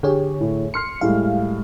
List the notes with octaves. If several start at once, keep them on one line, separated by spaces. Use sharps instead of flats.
D3 G4 G#4 C#5
A2
C6 F6 C7 C#7
A2 G3 G#3 F5